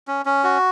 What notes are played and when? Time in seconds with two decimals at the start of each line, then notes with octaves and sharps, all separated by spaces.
0.08 C#4
0.26 C#4
0.44 F#4